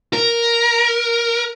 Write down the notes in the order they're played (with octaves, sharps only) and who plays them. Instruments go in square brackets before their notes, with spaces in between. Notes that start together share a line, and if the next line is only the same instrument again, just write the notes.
[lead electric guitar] A#4